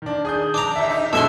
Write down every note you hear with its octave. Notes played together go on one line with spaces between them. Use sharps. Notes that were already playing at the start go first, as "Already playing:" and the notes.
D#3 D4
G#4 D#6 G6
D4 D5 A#5 D6
D#2 A#2 E5
D#4
F#2 B2 G#3 A4 E5 C6